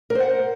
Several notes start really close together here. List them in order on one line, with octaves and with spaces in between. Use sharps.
A#4 C5 F#5